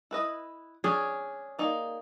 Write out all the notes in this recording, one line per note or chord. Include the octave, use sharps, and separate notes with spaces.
E4 B4 D#5
C#4 D4 G#4
A#3 D#4 D5